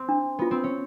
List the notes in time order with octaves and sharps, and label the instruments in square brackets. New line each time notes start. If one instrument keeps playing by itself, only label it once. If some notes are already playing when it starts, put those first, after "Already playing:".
Already playing: [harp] C4
[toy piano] D4
[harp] B3 [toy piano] F4
[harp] C4
C#4